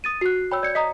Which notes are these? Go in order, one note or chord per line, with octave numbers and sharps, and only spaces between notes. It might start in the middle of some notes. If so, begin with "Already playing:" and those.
D#6 A6 D#7
F#4 F#6 C7
C#5 G5 B5 E6
D5 G6 C#7
D#5 A#5 D#6 B6